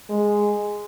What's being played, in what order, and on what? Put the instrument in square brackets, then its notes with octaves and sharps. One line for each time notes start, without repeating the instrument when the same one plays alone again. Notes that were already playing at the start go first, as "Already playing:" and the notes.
[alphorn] G#3